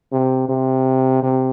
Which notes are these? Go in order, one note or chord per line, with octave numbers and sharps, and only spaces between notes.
C3
C3
C3